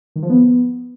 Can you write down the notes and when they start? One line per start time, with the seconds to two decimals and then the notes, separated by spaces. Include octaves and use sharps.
0.16 D#3
0.23 F3
0.29 B3